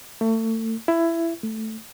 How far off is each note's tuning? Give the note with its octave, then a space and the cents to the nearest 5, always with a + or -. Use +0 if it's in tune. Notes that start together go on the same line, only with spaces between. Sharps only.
A3 +30
E4 +15
A3 +0